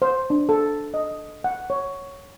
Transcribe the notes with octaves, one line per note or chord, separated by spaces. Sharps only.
C5
D4
A4
D#5
F#5
C#5